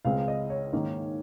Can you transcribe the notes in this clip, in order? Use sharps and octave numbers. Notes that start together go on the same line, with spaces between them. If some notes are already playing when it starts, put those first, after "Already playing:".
C#2 C#3 G#3 C4 F5
D#5
C#5
G#2 D#3 A#3 C#4